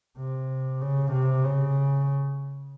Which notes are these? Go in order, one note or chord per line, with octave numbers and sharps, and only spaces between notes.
C3
C#3
C3
C#3